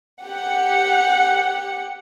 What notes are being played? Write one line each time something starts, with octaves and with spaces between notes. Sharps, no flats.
G4 F#5